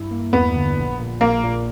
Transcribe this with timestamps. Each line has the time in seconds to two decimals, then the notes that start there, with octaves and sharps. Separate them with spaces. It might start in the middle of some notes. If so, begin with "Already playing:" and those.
Already playing: G2 E4
0.11 A#3
0.33 E2 B3
0.56 D3
0.77 A#1
0.99 A#2
1.21 A#1 A#3
1.43 A#2